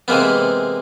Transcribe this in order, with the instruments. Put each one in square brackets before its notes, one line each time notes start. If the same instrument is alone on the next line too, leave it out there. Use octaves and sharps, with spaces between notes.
[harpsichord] C3 E3 G#3 A#3 B3